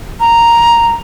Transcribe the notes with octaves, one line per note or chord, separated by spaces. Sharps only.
A#5